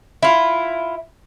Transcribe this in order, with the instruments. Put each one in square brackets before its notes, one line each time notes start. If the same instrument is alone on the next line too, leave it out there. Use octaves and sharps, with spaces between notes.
[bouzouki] E4 F4